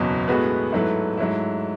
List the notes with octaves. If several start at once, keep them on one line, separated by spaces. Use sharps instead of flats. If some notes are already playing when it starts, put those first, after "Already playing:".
Already playing: F#1 E2 B2 F#3
A2 G#3 B3 F#4 B4
G#2 F#3 A3 E4 B4
G#2 F#3 A3 E4